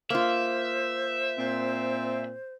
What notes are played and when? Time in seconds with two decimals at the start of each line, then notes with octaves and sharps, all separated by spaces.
0.10 A#3 F4 C5 E5
1.38 A#2 C4